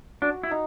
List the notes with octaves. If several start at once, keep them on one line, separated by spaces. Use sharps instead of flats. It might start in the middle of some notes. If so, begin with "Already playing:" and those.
D4 F#4
E4
D#4